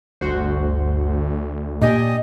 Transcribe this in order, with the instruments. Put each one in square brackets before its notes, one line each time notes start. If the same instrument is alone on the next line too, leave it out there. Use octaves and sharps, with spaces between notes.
[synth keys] G1 F#4 C5 [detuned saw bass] D2
[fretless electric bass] A#2 [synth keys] D4 G4 G#5 [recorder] D#5